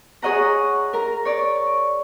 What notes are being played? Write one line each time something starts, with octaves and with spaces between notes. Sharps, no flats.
G#4 C#5 D#5 F#5 A#5
A#4 A#5
C#5 D5